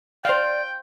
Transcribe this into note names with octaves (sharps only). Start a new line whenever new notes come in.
C5 D5 F5 G5